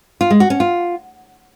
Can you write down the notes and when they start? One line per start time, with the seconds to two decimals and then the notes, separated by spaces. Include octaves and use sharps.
0.21 F4
0.30 G#3
0.40 F#4
0.50 C#4
0.60 F4